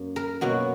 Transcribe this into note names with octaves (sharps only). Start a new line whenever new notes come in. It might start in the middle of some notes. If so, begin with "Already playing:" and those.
Already playing: F#2 A#3
A#4
B2 F#3 A#3 F#4